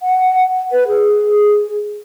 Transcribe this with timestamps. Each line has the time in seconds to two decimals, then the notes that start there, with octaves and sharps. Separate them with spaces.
0.02 F#5
0.71 B4
0.87 G#4